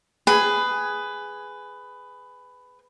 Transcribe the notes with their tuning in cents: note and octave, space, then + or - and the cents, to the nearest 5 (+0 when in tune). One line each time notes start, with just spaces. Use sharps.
G#4 +0 B4 +15 G#5 +5